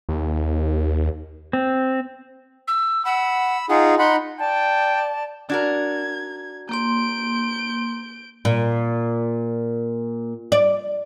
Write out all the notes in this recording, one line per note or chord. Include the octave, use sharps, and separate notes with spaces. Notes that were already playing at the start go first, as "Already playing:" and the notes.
D#2
C4
E6
F#5 B5 E6
D#4 F4 G#4 F#5
D#4 F#5 B5 C6
D5 G5 A5
D4 F#4 A#4 G#6
A#3 C6 G6 D7
A#2
D5